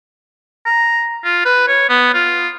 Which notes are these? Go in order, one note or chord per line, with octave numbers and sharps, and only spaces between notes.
A#5
F4
B4
C#5
B3
F4